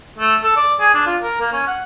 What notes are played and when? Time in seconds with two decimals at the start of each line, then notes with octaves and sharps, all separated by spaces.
0.19 A3
0.43 A4
0.57 D5
0.80 G#4
0.94 D4
1.07 F4
1.22 A#4
1.41 A#3
1.53 C#4
1.67 F#5